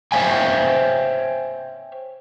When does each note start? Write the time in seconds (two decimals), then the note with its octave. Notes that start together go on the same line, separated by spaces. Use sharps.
0.12 C5 C#5 E5 F5 G5 G#5